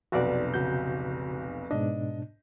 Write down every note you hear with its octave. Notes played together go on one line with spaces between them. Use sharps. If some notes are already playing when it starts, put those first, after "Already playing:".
F1 B1 F#4 D5
C#3 F#4 G6
G#2 B2 D4 D#5